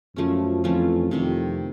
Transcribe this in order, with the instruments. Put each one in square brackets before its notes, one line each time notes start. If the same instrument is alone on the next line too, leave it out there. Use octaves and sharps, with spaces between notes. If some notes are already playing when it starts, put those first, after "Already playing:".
[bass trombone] F#2 [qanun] F3 A3 C#4
[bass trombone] F2 [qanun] E3 A3 C#4 F4
[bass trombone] F2 [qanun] C3 D#3 G3